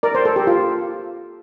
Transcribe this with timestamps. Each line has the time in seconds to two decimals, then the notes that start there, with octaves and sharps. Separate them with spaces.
0.03 A#4 D5
0.15 C5
0.25 A4
0.36 G4
0.47 F4